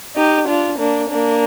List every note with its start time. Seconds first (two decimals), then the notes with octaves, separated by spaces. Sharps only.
0.16 D#4 G4
0.47 D4 F4
0.79 A#3 D4
1.09 A#3 D4